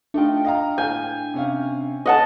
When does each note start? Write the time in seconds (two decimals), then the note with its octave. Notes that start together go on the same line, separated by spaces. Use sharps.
0.14 A3 D4 D#4 F4 G5
0.45 D#5 F5 A#5
0.78 A2 F5 G#5 G6
1.34 C3 C#4 F5
2.06 D#5 F#5 A5